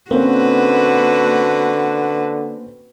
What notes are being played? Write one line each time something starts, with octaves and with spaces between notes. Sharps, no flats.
D3 A#3 C4 C#4 F#4 B4